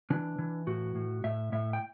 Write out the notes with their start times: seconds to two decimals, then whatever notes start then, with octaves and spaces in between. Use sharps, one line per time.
0.10 E3 D4
0.38 E3
0.67 A2 F#4
0.95 A2
1.24 A2 E5
1.52 A2 E5
1.73 G5